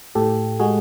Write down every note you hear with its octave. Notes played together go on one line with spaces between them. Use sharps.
A2 G4 A4
G#3 F#4 G#4